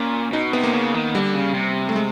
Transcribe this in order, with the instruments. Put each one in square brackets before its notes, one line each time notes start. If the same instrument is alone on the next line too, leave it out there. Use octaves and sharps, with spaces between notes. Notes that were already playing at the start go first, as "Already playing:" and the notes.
Already playing: [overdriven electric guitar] A#2 [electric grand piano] C#4
[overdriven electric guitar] B2 [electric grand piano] D#4
[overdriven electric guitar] C3 [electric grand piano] B3
[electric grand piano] A#3
[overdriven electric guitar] C#3
D#3
[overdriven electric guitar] D3 [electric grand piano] G3
[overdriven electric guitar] C#3
C3
[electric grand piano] A3
G#3